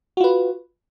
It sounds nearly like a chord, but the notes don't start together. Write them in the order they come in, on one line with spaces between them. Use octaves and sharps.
F#4 F4 B4